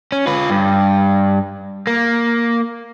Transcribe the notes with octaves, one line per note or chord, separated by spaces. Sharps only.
C#4
F4 B4
G2
A#3